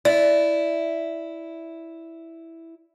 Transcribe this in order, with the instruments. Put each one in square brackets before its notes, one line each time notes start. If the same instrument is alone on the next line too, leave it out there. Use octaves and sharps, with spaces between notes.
[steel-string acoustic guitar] E4 [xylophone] D5